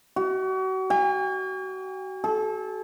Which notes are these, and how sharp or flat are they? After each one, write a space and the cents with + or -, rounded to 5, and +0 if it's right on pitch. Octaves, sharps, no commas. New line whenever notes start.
F#4 +35
G#5 -45
A4 -30